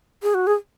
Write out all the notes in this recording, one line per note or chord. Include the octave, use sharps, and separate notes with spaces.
G#4
F#4
G#4